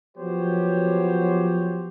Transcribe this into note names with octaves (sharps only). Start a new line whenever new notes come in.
F3 F#3 B3 G4 C5 C#5